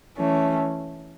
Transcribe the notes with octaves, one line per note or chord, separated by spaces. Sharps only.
E3 A3 C#4